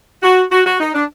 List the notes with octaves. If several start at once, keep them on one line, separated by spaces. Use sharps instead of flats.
F#4
F#4
F#4
D#4
D4